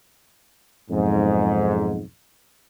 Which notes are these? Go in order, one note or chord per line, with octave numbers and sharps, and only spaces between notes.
B1 F2 G#2